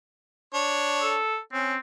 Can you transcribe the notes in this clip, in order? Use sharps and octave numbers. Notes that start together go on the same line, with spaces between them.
D4 C#5
A4
C4 C#4